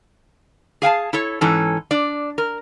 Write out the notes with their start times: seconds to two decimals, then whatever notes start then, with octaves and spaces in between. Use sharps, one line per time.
0.82 G#4 F5 G5 A5
1.13 E4 A4 C#5
1.41 G#2 E3 C#4 A4
1.91 D4 D5
2.38 A#4